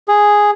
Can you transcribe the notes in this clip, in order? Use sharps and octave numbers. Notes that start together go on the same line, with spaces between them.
G#4